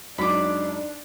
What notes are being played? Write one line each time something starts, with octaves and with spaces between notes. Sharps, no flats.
F#2 F#3 G#3 D4 D#4 B5 D6